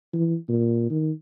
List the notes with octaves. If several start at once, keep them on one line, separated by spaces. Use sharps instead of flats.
E3
A#2
D#3